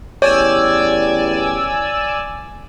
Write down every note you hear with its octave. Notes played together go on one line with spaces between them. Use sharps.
A1 E2 G4 C#5 D5 G#5 E6